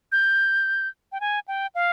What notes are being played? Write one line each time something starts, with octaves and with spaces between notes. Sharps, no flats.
G6
G5
G#5
G5
F5